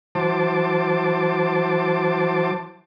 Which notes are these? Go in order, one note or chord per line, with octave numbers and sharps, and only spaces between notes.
E3 F#3 C5 A5 D6